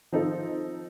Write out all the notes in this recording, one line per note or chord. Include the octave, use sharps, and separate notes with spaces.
F3 C4 D#4 A4